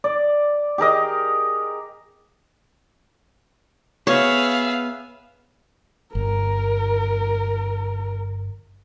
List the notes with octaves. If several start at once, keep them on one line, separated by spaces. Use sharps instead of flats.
D5
G4 G#4 A#4 D#5
B3 G#4 C#5 E5 F5
G1 A#4